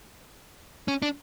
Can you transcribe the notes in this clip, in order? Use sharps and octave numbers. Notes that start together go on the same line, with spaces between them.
C#4
D4